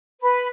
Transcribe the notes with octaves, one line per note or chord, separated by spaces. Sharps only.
B4